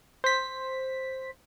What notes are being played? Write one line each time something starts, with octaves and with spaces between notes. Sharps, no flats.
C5 B6